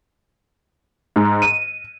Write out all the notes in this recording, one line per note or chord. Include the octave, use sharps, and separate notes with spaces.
G#2
D#7